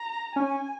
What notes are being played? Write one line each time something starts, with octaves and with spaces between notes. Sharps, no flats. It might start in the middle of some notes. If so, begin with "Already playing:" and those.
Already playing: A#5
C#4 G#5